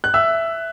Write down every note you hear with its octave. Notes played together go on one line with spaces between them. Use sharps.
F#6
E5 E6